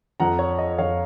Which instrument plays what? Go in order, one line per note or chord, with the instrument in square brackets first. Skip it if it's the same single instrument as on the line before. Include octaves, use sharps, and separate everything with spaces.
[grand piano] F2 F3 F#5 A#5
C#5
D#5
F2 F3 C#5 F5